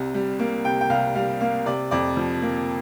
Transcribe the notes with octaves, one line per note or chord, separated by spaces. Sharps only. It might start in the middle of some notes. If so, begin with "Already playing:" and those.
Already playing: C2 C3
G3
A#3
C3 G5
G5
C2 F5
G3 F5
A#3 F5
C3 D5
F2 D5
F3
A#3